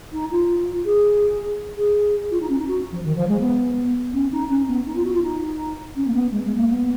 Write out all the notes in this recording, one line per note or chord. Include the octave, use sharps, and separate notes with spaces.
D#4
F4
G#4
G#4
F4
D#4
C#4
D#4
F#4
F3
D#3
F3
G#3
B3
C#4
D#4
C#4
B3
D#4
F4
F#4
F4
D#4
C#4
A#3
B3
G#3
G#3
A#3
B3